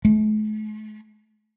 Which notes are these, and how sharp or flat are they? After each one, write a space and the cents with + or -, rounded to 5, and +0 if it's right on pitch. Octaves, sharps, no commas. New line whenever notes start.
A3 -45